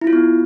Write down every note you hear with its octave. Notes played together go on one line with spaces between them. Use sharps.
E4
F4
B3